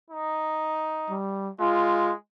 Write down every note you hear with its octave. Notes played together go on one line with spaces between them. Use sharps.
D#4
G3
G#3 F4